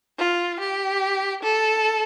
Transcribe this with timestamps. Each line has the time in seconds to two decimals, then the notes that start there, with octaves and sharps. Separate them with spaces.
0.18 F4
0.60 G4
1.43 A4